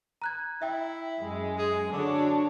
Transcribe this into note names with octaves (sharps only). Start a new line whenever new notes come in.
A#5 F#6 G#6
E4 E5 G5
F#2 G#3
G#4
D3 D4 F#4 C#5